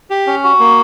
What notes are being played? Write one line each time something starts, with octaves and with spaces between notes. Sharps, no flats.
G4
C#4
F#4
A#3